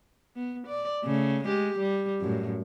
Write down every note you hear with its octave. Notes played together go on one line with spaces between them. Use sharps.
B3
D5
C#3 A3
G#3 G4
G3
F#2 A2